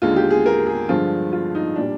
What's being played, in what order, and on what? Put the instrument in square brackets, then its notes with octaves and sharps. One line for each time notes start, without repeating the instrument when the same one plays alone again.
[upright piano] D#2 D3 G#3 F4
G4
G#4
A#4
G#4
G2 D3 F3 G#3 F4
F4
D#4
A#2 G3 D4